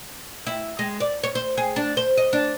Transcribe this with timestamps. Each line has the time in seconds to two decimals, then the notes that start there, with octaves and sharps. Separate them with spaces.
0.47 E4
0.79 G#3
1.00 D5
1.23 C#5
1.35 C5
1.58 G#4
1.76 D4
1.97 C5
2.17 D#5
2.33 D4